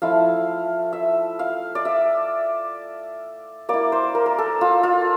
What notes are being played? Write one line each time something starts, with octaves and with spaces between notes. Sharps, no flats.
F3 A3 E4 F5
E5
F5
D5
E5
A#3 E4 D5
C5
A#4
A#4
A4
F4
F4